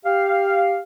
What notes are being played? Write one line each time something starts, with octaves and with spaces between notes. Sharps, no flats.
G4 F5